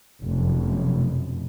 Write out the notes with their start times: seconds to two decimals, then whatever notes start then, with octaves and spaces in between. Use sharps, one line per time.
0.22 F1 F#2 B2